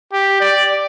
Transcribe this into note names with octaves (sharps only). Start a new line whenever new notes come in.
G4
D5